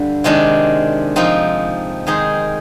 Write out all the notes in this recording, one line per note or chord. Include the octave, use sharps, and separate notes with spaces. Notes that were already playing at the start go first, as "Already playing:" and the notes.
Already playing: G2 D3 G3
C3 D#3 G#3 D4
F3 C4 D#4
D#3 G#3 D#4 G#4 C5